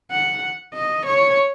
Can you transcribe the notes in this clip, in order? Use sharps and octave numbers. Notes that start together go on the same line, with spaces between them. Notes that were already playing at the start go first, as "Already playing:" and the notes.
F#5
D#5
C#5